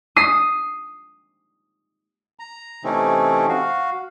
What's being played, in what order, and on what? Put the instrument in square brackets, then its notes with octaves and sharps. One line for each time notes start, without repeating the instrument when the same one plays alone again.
[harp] D#6 C7
[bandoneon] A#5
C3 E3 A3 C4 C#4 D#4
F#4 F5